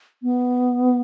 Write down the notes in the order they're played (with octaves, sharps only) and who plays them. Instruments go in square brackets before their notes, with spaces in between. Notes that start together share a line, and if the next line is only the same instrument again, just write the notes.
[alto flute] B3